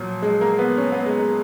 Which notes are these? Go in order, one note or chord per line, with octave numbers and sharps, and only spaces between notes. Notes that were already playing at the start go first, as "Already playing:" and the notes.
Already playing: A#2 F3 F#3
G#3
A#3
B3
C#4
B3
G#3
G#3